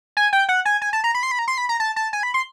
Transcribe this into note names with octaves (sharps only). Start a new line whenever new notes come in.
G#5
G5
F#5
G#5
G#5
A5
A#5
B5
C6
B5
A#5
C6
B5
A#5
A5
A5
G#5
B5
C6